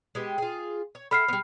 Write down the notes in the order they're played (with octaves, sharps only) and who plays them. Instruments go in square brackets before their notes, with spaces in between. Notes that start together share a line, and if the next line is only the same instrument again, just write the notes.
[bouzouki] G#3 B3 G4
F4 G#4
C#5
[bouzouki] A4 E5 F#5 [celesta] B5 F6 C7
[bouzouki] G3 B3